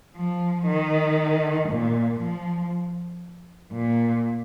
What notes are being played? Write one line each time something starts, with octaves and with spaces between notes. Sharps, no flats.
F3
D#3
A#2
F3
A#2